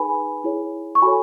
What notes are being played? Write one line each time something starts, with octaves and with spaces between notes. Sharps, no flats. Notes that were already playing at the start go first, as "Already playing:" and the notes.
Already playing: D#4 G#4 B4 G#5 B5
E4 G#4 C#5
C#6
F#4 A4 C#5 G#5 B5